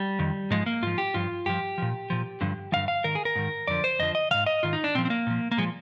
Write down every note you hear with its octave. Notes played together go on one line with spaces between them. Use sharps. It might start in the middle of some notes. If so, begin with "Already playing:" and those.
Already playing: G3
F2 D#3
G#2 F3 G#3
A#3
G#2 F3 F4
G4
G2 F3 F4
G2 F3 G4
A#2 F3
A#2 F3
G2 D3 F3
G2 D3 F3 F5
F5
G#2 D#3 A#4
G#4
A#4
G#2 D#3
F2 D3 F3 D5
C5
F2 D3 F3 D#5
D#5
G#2 D#3 F5
D#5
G#2 D#3 F4
D#4
D4
A#2 F3 C4
C4
A#3
A#2 F3
A#3
A#2 F3 G#3